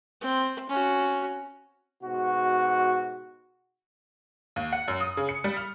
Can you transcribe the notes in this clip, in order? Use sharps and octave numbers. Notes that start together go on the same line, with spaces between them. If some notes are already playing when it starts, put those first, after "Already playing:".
C4
C#4 F#4
G#2 B2 F#4
D#2
F#5
F#2
D#6
C#3
C#7
G3
F6